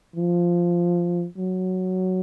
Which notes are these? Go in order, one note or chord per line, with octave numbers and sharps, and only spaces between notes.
F3
F#3